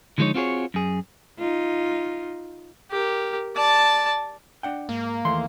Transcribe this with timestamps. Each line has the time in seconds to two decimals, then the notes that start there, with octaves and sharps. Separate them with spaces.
0.18 D3 F3 G#3 D#4 C#5
0.34 C4 F4 F#4 G#4 C#5
0.74 F#2 G#4
1.38 D#4 F4
2.91 G4 A#4
3.56 D5 A5
4.63 D4 F#5 G5
4.89 G#2 A#3
5.25 D#2 E3 A3 C6